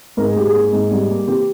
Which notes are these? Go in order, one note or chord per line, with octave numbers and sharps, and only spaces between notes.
G#2 A#4
G#4
G#2 G4
G#4
A#3
G#2
G3
A#3
E3 G4